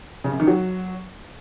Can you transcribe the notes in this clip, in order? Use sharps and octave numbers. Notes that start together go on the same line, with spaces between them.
C#3
F#2
D#3
F#3